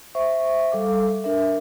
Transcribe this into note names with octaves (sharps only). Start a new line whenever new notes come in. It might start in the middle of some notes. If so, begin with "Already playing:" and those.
C5 E5 C#6
G3 A4 F5 D6
D4 A#4 E5